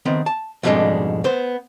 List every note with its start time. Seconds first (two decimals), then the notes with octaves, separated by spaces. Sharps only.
0.05 D#3 B3 C4
0.26 A5
0.63 F2 G#2 B2 G3 G#3 D4
1.24 B3 C5